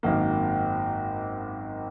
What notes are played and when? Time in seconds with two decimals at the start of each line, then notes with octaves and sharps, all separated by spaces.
0.03 G#1 F#2 D#3 A#3